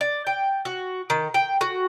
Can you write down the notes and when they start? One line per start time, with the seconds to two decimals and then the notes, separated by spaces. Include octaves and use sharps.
0.01 D5
0.27 G5
0.65 F#4
1.10 D#3
1.34 G5
1.61 F#4